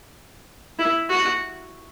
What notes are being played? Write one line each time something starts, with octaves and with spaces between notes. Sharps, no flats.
E4
F#4